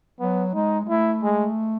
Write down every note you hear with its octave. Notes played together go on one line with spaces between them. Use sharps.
F#3 B3
G#3 D#4
G#3
A3 E4
G#3